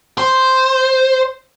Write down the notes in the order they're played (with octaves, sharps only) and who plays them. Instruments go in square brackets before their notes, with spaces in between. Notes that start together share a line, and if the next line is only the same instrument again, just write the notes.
[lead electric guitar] C5